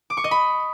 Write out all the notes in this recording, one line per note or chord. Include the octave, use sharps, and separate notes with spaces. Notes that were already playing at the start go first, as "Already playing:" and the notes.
D6
C#6
D#5
B5